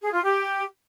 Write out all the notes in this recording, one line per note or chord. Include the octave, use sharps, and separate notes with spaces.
G#4
F4
G4